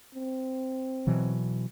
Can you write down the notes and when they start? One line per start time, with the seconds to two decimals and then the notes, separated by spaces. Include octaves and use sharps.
0.15 C4
1.07 B2 E3 F#3